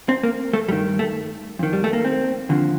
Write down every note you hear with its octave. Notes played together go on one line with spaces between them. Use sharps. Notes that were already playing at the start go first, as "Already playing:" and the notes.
C4
A#3
A3
G2 D#3 G3
A3
F2 D#3
G3
A3
A#3
C4
D#2 D3 F3